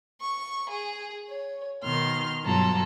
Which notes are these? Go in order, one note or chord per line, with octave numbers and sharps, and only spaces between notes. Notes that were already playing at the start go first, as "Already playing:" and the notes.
C#6
G#4
C#5
B2 D#3 C6 F6
G2 B2 F#3 F4 A4 A#5